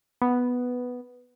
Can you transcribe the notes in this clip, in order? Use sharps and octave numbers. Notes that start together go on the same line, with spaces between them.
B3